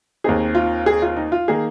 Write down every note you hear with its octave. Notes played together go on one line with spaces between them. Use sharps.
D#2 D#3 C4 D#4 G#4
F4
G#4
F4
D#4
F4
D#3 A#3 D#4 G#4